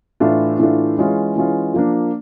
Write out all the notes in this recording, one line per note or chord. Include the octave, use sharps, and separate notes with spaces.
A2 E3 A3 D4 F4
A2 E3 A3 D4 F4
E3 G#3 C#4 F4
E3 G#3 C#4 F4
F3 A#3 D4